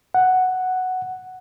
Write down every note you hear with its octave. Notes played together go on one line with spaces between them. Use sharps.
F#5